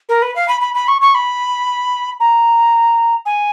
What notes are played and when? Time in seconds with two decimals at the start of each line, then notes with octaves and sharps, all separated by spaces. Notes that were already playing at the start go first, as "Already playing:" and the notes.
0.09 A#4
0.22 B4
0.35 F5
0.48 B5
0.61 B5
0.74 B5
0.88 C#6
1.01 C#6
1.14 B5
2.20 A#5
3.26 G#5